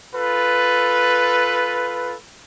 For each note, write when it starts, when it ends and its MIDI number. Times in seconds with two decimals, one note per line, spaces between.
0.15 2.15 65
0.15 2.15 69
0.15 2.15 71